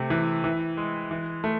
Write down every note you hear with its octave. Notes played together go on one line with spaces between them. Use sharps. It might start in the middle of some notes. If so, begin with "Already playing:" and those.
Already playing: C3 A3
E3
E3
G#3
E3
A3